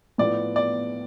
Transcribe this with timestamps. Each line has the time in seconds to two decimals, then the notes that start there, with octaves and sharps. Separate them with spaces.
0.18 A2 F3 B3 D5
0.56 D5